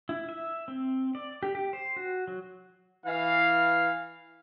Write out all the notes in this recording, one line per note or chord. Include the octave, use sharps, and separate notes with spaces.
E4
E5
C4
D5
G4
G4
C5
F#4
F#3
E3 F5